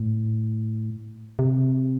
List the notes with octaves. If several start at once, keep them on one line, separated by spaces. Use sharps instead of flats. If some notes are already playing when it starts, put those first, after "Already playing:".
Already playing: A2
C3